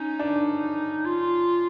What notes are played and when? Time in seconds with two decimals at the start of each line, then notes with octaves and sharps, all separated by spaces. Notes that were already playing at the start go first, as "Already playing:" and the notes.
Already playing: C#4 D#4
0.19 D4
1.05 F4